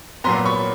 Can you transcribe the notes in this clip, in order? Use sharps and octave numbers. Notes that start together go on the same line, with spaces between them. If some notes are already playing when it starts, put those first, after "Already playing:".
A#2 F#3 B3 A#5 C6
B5 C#6